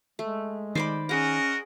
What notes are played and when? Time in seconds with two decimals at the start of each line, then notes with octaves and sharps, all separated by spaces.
0.19 G#3 A3
0.75 D#3 C5 D5 B5
1.09 C#4 F#4 G#4 A#4 D#5 F#5